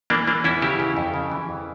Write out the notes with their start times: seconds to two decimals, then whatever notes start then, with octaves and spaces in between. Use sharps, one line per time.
0.10 E3 A#3 D4
0.27 E3 A#3 D4
0.44 E2 C#4 E4
0.62 C#3 E4 G4
0.80 C#3
0.97 F2
1.14 C#3
1.31 E3
1.49 F2